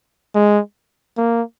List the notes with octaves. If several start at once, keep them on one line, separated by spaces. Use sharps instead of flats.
G#3
A#3